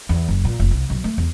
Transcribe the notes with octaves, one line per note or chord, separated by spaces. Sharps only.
E2
F#1
A#2
F1
C2
B1
A3
E2